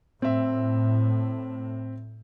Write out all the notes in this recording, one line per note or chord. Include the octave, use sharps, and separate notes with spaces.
A2 C4 E5